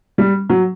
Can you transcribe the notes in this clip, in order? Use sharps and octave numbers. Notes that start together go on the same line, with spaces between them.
G3
F#3